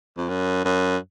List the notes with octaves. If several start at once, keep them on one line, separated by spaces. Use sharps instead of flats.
F2
F#2
F#2